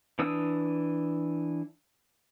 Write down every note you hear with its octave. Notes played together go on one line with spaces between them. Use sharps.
E3 D4 D#6 E6